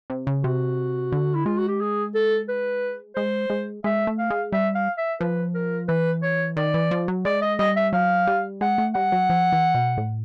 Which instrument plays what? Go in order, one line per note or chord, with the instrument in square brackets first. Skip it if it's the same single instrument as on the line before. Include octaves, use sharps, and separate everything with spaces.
[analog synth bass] C3
C#3
[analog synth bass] C3 [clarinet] F#4
[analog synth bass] D3
[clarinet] E4
[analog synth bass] G#3 [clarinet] F4
[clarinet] F#4
G4
G#4
A4
B4
[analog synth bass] G#3 [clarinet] C5
[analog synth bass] G#3
[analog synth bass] G#3 [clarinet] E5
[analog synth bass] A3
[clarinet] F5
[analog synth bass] G#3
[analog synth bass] G3 [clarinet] E5
[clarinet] F5
E5
[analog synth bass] F3 [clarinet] B4
[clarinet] A#4
[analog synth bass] E3 [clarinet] B4
[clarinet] C#5
[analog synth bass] D#3 [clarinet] D5
[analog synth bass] E3
F3
F#3
[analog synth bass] G#3 [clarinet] D5
[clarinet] D#5
[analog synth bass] G3 [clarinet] D#5
[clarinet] E5
[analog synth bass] F#3 [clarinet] F5
[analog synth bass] G3
[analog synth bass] G#3 [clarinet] F#5
[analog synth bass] A3
[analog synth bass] G3 [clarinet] F#5
[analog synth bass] F#3
F3
E3
B2
A2